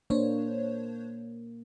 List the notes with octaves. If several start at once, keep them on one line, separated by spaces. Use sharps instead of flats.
A#3 D4 C5 C#5